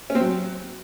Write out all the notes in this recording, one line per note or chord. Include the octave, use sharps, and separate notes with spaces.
C#4
C4
F#3